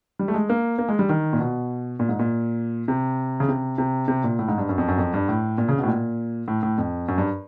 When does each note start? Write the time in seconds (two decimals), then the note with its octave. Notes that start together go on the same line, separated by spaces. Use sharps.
0.19 G3
0.28 A3
0.34 G#3
0.50 A#3
0.79 A#3
0.89 G#3
0.99 G3
1.09 D#3
1.33 A#2
1.40 B2
1.99 A#2
2.09 G#2
2.19 A#2
2.88 C3
3.40 C#3
3.48 C3
3.78 C3
4.08 C3
4.24 A#2
4.39 A2
4.48 G#2
4.58 G2
4.69 F#2
4.78 F2
4.88 F#2
4.98 F2
5.14 G2
5.29 A2
5.58 A#2
5.68 C#3
5.78 B2
5.84 A2
5.88 A#2
6.48 A2
6.63 A2
6.78 F2
7.08 F#2
7.18 G2